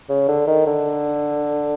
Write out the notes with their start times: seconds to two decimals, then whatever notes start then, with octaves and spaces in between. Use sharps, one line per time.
0.09 C#3
0.28 D3
0.47 D#3
0.67 D3